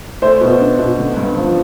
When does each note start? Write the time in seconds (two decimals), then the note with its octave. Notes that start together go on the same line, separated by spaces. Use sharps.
0.22 A3 C5
0.41 B2
0.60 D4
0.79 B2
0.98 D3
1.17 G2
1.36 F3